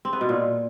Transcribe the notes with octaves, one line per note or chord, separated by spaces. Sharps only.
C4
B3
B2
A#2